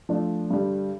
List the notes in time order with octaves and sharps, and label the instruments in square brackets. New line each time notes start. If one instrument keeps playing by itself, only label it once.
[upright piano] F3 A3 D4 F4
G2 D3 G3